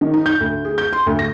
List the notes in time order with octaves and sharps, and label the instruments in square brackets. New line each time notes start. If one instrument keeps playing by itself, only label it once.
[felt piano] D#3
D#4
G6
D2
G#4
G6
C6
D2
A#6